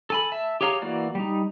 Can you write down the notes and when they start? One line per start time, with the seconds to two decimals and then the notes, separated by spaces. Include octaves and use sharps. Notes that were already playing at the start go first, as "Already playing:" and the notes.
0.10 A4 G#5 B5
0.32 E5 A5
0.61 G4 G#4 C#5 F5 A#5
0.82 E3 A#3 F#4 D5
1.15 G3 D#4